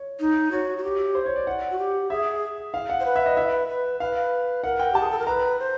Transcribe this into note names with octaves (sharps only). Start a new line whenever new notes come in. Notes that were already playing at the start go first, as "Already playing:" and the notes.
Already playing: C#5
D#4
F#4 C#5
F#4
G4
C5
C#5
D5
F#5
F#4
G4
G#4 E5
F5
F#5
C5
B4
E5
D#5
E5
B4
B4 F5
A#4 F#5
G5
G4 A5
G#4
A4
A#4
B4 A#5
C5